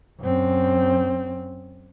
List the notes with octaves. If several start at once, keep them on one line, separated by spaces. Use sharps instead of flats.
F#2 C4